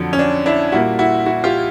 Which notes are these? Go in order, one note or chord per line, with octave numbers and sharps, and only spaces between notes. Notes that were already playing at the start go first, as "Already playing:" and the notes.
Already playing: F2 D3 F#3
C#4
D4
D4 E4
A#2 G3 A#3 E4 F#4
E4 F#4
E4 F#4
F4 G4